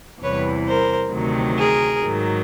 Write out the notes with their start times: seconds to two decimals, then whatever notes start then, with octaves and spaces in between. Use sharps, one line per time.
0.22 E2 C3 E3 G3 B4 C#5
0.67 A#4 C5
1.12 D2 C3 D#3 F#3
1.57 G#4 A#4
2.01 G#2 D#3 F#3